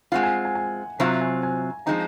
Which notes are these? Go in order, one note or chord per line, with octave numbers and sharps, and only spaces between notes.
G#3 C4 F4 F#5
G#5
G#5
G#5
C3 F#3 C4 F4 A#5
G#5
G#5
F3 G#3 C4 D#4 A#5